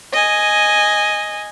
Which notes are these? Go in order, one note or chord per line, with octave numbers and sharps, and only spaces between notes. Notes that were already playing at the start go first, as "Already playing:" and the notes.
D#5 G#5